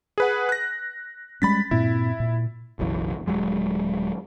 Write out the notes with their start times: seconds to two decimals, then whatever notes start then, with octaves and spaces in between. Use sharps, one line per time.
0.18 G#4 B4 F#5
0.49 F#6 A#6
1.42 G3 G#3 C#4 B5 A6 B6
1.71 G2 A#2 C4 E4
2.20 A#2
2.79 F#1 B1 F#2 E3
3.27 D#1 F2 F#3 G#3